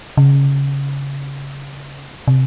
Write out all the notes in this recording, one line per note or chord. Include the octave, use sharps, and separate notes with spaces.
C#3
C3